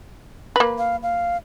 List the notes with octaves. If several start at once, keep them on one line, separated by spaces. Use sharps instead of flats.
A#3 B4
F5
F5